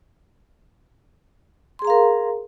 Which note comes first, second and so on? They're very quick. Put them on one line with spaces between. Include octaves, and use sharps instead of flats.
C6 G#4 A#5 F5 A#4